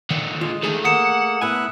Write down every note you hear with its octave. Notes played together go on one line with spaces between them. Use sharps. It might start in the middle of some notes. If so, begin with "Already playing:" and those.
A#2 D3 D#3
G#3 F4
E2 D#3 A3 G#4 A4
A#3 F#5 D#6 C#7 E7
A2 B3 E4 G#5 F#6